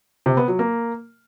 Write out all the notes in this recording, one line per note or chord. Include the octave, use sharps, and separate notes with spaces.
C3
B3
F#3
A#3